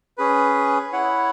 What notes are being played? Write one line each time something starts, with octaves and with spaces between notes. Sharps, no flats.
C#4 G#4 B4
E4 C#5 F#5